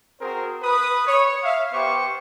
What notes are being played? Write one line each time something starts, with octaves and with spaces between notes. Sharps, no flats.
C4 F#4 G#4 A#4 C5
B4 D#6
C#5
E5 F5
B3 G4 C5 C#6 D6